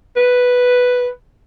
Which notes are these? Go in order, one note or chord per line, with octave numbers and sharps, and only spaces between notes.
B4